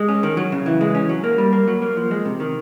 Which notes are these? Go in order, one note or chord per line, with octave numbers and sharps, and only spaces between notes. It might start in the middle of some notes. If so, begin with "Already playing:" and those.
Already playing: G#3
C#4
D#3
F#3
C#3
E3
G#3
C#4
F#3
A#3
G3
A#3
F#3
A#3
F3
G#3
C3
D#3